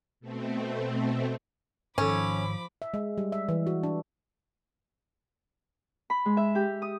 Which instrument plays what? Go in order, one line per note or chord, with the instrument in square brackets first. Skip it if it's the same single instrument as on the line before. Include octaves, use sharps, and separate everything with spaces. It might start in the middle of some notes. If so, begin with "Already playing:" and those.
[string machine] B2 A3 C4
[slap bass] G#2 D#3 [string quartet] F3 B5 D6 [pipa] C#4 [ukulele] A4 C#5
[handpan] E5
G#3
G3
E5
E3
F#4
D4
[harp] B5
G#3
E5
G4
D#6